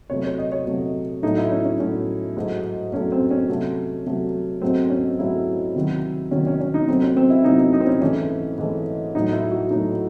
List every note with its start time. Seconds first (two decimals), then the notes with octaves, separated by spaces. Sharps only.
0.10 C3 F#3 A3 C#5
0.25 C#5
0.38 D#5
0.52 C#5
0.67 C3 F#3 A3
1.23 A2 F#3 A3 D#4
1.38 E4
1.52 C#4
1.65 C#4
1.79 A2 F#3 A3 C#4
2.37 G#2 F#3 A3
2.92 G#2 F#3 A3 C#4
3.12 C4
3.31 C#4
3.49 C3 F#3 A3
4.06 C3 F#3 A3
4.62 G#2 F#3 A3 C4
4.90 C#4
5.19 G#2 F#3 A3 E4
5.75 C3 D#3 F#3
6.31 C3 D#3 F#3 C#4
6.47 C#4
6.61 C#4
6.74 D#4
6.88 C3 F#3 A3 C4
7.03 C#4
7.17 C4
7.30 E4
7.44 C3 F#3 A3 D#4
7.59 D#4
7.73 D#4
7.80 C4
7.87 C#4
8.02 G#2 E3 A3 C#4
8.58 G#2 E3 A3
9.14 A2 F#3 A3 D#4
9.33 E4
9.52 F#4
9.70 A2 F#3 A3 D#4